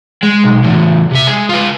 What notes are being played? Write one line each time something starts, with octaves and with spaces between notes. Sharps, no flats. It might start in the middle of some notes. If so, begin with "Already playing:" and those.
G#3
B1
E2 A2
C3 E5
G#3
F4 B4